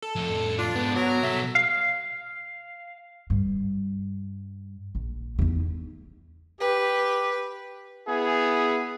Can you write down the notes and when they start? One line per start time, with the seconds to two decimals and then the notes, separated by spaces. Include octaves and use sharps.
0.02 A4
0.16 F2 A2
0.59 D4 F4
0.75 G#2 G3 B3
0.95 F#3 A#4
1.23 B1 A4 E5
1.55 F5
3.30 G2
4.95 A#1
5.39 E2 D#4
6.61 G4 B4
8.07 B3 E4 G#4